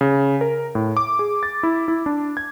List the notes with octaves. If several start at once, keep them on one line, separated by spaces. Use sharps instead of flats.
C#3
A#4
A2
D6
G#4
A6
E4
E4
D4
G#6